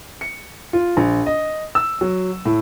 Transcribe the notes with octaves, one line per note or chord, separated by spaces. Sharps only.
C#7
F4
A#1
D#5
E6
F#3
A2